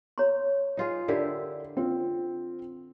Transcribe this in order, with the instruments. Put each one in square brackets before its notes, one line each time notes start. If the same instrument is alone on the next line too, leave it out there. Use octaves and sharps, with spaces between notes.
[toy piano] C#5 A#5 C6
[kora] D#4 F4 G#4
[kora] D3 E4 G4 [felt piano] A#4
[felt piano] C4 F4 C5